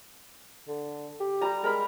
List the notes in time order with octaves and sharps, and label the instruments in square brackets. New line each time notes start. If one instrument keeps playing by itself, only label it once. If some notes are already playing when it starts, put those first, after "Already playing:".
[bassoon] D3
G4
[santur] G3 A#5
[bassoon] G#3 [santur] A#4 B5